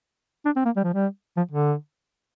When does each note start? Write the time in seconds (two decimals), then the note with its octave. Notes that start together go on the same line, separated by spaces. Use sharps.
0.45 D4
0.56 C4
0.65 A#3
0.76 G3
0.84 F3
0.94 G3
1.37 F3
1.51 D3